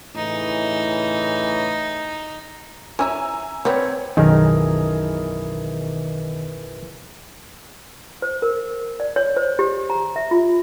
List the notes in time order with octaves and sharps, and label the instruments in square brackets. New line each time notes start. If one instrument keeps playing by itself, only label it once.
[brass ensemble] A2 C#3 E3 [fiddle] D#4
[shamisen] C#4 E4 E5 [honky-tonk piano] G#5 A#5 E6
[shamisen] G3 B3 [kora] C4 [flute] C#5
[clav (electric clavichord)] B1 F#2 [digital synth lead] D#3 [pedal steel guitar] E3 G#4 A#4
[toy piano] C5
A#4
D5
C#5
C5
G4
A#5
E5
F4